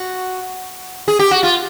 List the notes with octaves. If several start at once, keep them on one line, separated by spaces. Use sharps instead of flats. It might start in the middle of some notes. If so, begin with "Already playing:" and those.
Already playing: F#4
G#4
G4
F#4
F4